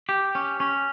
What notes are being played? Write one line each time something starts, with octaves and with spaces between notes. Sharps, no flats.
G4
C#4
C#4